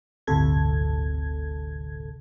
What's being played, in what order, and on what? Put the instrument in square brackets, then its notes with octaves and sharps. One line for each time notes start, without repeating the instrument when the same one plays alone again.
[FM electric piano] G1 D2 A2 C3 A4 G#6